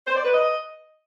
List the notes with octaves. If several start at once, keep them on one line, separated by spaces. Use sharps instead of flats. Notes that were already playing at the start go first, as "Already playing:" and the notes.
C5
D5
B4
D#5